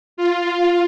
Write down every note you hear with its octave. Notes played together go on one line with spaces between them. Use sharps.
F4